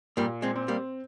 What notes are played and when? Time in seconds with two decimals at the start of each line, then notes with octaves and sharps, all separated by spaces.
0.17 A#2 G3 A#3
0.42 G#3 C4
0.56 C4
0.68 G3 A#3